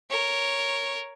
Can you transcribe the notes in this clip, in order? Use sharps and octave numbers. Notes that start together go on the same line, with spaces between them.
A#4 C#5